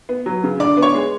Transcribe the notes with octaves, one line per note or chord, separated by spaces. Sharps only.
B3
F#3
C#3
D3 D5 D6
B3
C#5 C#6
G#3